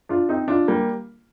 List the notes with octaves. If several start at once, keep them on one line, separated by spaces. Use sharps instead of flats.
D4 F4
C4 D#4
D4 F4
G3 A#3